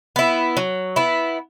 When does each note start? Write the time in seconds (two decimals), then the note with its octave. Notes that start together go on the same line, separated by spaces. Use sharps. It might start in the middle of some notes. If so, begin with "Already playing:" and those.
0.16 B3 E4
0.57 F#3
0.96 B3 E4